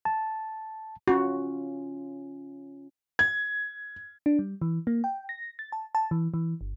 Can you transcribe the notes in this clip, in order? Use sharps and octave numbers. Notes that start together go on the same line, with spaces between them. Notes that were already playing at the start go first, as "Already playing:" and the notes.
A5
C#4 F4 F#4
G#6
D4
G3
E3
A#3
G5
A#6
A6
A5
A5
E3
E3
G1